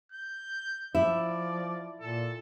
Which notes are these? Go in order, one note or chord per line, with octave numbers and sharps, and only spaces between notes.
G6
F3 E4 D5
A#2 A4